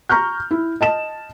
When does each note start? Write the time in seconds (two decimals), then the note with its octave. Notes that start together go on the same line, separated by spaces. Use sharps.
0.09 A#5 C#6 F6 G6
0.51 E4
0.81 D#5 A5 E7